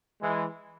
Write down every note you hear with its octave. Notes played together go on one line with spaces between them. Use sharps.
E3 G#3